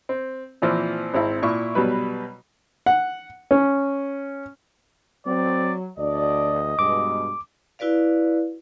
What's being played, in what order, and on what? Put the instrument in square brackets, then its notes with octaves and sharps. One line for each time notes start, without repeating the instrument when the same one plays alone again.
[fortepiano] C4
A#2 E3 F3 C4
G#1 C4 E4
A#2 E4 C#6
B2 F#3 G3 B4
F#5
C#4
[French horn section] F#3 [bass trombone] C4 [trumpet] D5
[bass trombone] D2 [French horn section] D4 F#4 D5 [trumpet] D#5
[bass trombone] G2 [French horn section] B2 G#3 [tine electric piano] D6
[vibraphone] E4 F#4 B4 D5 F5